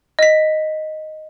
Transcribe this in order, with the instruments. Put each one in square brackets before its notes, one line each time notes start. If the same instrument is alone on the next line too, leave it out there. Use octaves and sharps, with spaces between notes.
[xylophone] D#5 B6